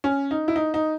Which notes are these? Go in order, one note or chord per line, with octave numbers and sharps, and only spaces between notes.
C#4
D#4
E4
D#4
D#4